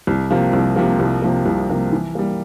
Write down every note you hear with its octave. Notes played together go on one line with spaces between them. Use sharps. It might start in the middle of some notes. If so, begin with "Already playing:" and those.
C2
C3 F3 A#3
C2
C3 F3 A#3
C2
C3 F3 A#3
C2
C3 F3 A#3
E3
G3 A#3